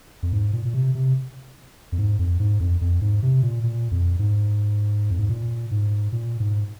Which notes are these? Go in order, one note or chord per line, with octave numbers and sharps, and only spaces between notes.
F2
G#2
A#2
A#2
C3
C3
F2
G#2
F2
G#2
F2
F2
G#2
C3
A#2
A#2
F2
G#2
F2
G#2
A#2
G#2
A#2
G#2